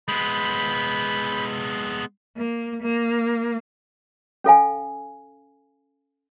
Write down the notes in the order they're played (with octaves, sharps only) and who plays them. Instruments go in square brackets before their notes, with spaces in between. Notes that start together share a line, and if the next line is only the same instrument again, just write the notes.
[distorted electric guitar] G#3 B3 [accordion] B5 G6
[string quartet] A#3
A#3
[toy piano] C#4 A4 F5 G#5